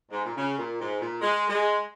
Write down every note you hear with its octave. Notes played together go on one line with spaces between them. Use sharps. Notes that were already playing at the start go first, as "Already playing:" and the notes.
G#2
A#2
C#3
A#2
G#2
A#2
G#3
G#3